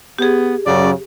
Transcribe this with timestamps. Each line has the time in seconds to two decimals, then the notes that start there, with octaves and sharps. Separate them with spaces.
0.19 B3 G4 G#4
0.65 F#2 C#3 F#3 D5